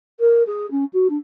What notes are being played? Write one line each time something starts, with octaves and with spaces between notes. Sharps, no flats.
A#4
G#4
C#4
F#4
D4